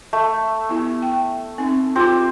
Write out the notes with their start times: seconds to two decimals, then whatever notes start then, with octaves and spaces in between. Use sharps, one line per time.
0.13 A3
0.69 B3 E4 G4
1.02 G5
1.58 C4 D#4
1.96 C4 F4 G4 D6